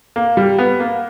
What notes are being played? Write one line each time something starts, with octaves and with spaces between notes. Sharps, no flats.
A#3
G3
B3
A#3